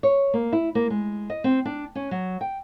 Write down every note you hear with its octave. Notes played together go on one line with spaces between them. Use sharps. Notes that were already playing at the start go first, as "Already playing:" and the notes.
C#5
A#3
E4
A#3
G#3
D#5
C4
D4
C#4
F#3
G5